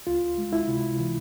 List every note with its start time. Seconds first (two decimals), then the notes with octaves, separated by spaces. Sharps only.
0.07 C#2 F4
0.38 G#3
0.53 E4
0.68 C3
0.99 E3